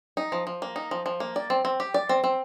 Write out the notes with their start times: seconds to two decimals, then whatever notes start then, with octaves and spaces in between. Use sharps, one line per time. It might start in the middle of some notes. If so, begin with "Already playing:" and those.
0.17 D#4
0.32 F3
0.47 F3
0.62 A#3
0.76 D#4
0.91 F3
1.06 F3
1.20 A#3
1.36 D5
1.50 C4
1.65 C4
1.80 G4
1.94 D5
2.09 C4
2.24 C4